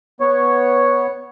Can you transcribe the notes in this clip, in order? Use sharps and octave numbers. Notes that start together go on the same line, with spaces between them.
B3 C#5